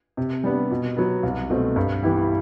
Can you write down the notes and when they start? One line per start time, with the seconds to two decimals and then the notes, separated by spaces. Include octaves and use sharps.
0.17 C3
0.44 G3 B3 D4
0.71 B2
0.97 F#3 B3
1.23 C2
1.50 B2 A3 C4
1.76 G2
2.03 E3 B3 E4 G4